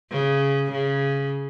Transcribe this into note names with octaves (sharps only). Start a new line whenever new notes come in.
C#3
C#3